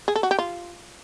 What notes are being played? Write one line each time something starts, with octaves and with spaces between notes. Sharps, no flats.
G#4
A4
F#4
G4
F4